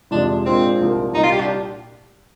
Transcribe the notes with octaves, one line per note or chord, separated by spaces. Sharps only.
F2 C3 F3 G#3 D4
A#2 G#3 C4 D4 F4
C2 A#2 F3 A#3
C2 A#2 G3 D#4
F4
G4
D4